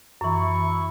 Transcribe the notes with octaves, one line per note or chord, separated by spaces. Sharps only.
F#2 E3 E4 C#6